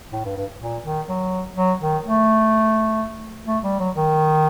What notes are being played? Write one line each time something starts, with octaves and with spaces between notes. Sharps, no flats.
A2
G2
G2
A#2
D#3
F#3
F#3
D#3
A3
A3
G3
F#3
D#3